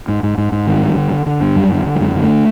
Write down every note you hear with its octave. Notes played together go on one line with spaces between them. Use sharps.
G#2
G#2
G#2
G#2
G2 D#3
G2
D3
D3
D3
G2
F#2 G3
D3
D3
G3
F#2 G#3
D3
A3